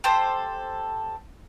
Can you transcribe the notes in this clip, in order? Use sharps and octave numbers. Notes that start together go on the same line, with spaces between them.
G4 A4 C5